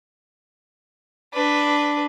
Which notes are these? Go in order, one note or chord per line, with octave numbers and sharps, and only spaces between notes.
D4 B4